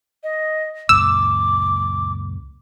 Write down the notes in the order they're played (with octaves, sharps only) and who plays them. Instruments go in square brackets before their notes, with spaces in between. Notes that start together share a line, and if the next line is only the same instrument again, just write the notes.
[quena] D#5
[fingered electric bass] C#2 F#2 A#2 [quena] D6 [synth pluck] E6